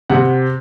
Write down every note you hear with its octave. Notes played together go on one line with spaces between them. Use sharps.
C3 F#5